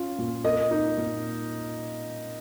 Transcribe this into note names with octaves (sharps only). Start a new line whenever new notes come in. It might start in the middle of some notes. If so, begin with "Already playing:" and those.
Already playing: C#4 F4
A#2
A#3 D#5
D#4
A#2